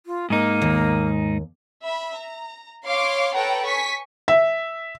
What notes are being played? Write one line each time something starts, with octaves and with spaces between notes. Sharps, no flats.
F4
G#2 A#3 D#4
D#2
E5 B5
A#5
C#5 F5 C6 D6
A4 B4 C#5 F#5 G5 A#5
G#5 C#6 B6
E5